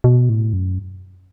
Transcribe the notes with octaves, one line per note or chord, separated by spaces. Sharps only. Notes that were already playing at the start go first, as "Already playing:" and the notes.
B2
A2
F#2